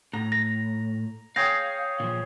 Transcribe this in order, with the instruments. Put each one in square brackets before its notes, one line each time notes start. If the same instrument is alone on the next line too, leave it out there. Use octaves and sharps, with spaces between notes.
[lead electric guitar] A2 [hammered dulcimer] A#5
[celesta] A#6
[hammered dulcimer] G#4 C#5 G5 [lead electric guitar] F5 [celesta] A#6
[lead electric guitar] A#2 F3